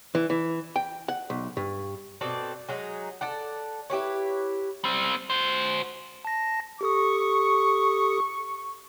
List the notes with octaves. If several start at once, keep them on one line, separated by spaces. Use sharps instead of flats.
E3
E3
G5
F#5
B1
G2
B2 C4 A4 D5
F#3 G#3 D#4
A4 D5 F#5
E4 G4 B4 C#5
G3 C4
F#4 C5
A5 A#6
G4 A4 C#6 D#6